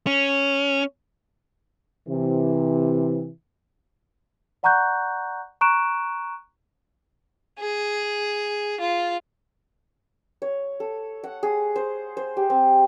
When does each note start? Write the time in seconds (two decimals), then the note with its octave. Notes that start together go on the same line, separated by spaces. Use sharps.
0.07 C#4
2.08 C3 E3
4.63 D5 F#5 A#5 C#6 F#6 G6
5.61 A#5 C#6 F#6 D7 E7
7.59 G#4
8.80 F4
10.42 C#5
10.80 A4
11.24 F#5
11.43 G#4
11.76 C5
12.17 C5
12.37 G4
12.50 C4